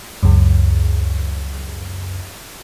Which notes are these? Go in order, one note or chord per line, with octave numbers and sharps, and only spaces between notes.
C#2 F#2